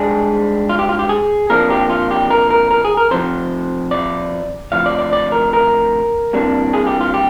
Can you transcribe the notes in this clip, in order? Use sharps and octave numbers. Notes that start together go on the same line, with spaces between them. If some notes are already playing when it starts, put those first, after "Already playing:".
Already playing: G#2 G3 D4 G#4
F4
G4
F4
G4
G#4
C3 F3 A#3 D4 A#4
G4
F4
G4
A#4
A#4
A#4
G#4
A#4
F2 C3 F3 C5
D5
D2 C3 F3 F5
D5
D5
D5
A#4
A#4
C2 C3 G3 A#3 D4
G#4
G4
F4
G4